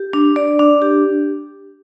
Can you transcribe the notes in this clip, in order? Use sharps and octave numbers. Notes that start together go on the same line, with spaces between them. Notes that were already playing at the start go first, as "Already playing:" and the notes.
Already playing: G4
D4
D5
D4
G4